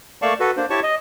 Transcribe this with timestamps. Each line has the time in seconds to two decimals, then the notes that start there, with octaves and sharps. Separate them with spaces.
0.22 A3 A#3 D5 F5 A5 C#6
0.40 F#4 A4 B4
0.57 A#3 D4 C5
0.70 E4 G4 C#5 A5 C#6
0.83 D#5